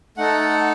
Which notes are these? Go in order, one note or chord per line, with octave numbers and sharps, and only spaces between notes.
A3 D#4 A4 F#5